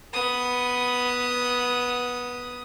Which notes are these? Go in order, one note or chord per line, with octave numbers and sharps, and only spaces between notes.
B3 D#6